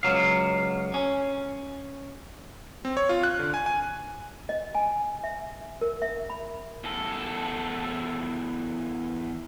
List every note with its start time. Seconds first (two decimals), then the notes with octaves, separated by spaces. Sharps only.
0.03 C#2 F#3 F5
0.94 C#4
2.85 C4
2.97 C#5
3.09 F4
3.23 F#6
3.39 D3
3.54 G#5
3.66 G#5
4.49 D#5
4.75 G#5
5.24 E5
5.81 A#4
6.02 E5
6.30 B5
6.84 E2 A4